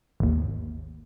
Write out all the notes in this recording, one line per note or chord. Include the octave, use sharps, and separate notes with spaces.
G#1 D#2